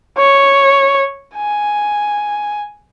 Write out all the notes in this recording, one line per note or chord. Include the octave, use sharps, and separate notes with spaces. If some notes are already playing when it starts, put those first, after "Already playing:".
C#5
G#5